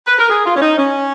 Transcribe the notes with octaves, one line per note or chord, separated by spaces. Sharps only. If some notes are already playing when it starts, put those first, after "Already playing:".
B4
A#4
G#4
F4
C#4
D#4
C#4